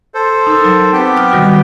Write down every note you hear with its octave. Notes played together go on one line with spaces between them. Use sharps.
A4 C5
D#4 A#4
F#3
B3 C4 G4 C5 G5
D#6 F6
D#3 G3 F#4